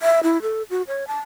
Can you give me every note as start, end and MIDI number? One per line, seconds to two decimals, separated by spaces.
0.02 0.20 76
0.23 0.41 64
0.42 0.63 69
0.70 0.82 66
0.88 1.07 73
1.08 1.18 81